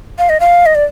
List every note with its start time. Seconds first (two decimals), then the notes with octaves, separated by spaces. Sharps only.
0.18 F5
0.29 D#5
0.40 F5
0.66 D#5
0.75 D5